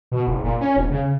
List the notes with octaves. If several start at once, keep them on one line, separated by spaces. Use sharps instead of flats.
B2
F#1
A#2
C#4
E1
C#3